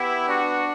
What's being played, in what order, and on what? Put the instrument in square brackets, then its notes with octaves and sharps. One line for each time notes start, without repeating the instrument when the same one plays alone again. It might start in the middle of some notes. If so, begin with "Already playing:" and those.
Already playing: [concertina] B3 G4 [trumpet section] E4
[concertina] D4 [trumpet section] F#4